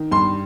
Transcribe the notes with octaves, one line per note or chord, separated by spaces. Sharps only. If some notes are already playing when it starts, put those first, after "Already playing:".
Already playing: D#3
G2 C6